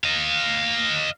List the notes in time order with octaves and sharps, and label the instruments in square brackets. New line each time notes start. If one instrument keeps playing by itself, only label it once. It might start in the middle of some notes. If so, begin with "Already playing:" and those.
[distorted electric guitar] D#5 F5